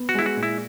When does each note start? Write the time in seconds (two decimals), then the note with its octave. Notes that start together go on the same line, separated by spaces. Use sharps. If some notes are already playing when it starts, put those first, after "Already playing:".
Already playing: B3
0.09 F#4
0.14 G#3 E4
0.26 F#4
0.36 A#2
0.43 E4